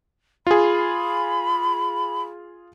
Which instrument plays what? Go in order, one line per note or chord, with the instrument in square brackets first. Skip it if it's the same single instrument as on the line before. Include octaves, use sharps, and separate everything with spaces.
[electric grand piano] F4 G#4 [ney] B5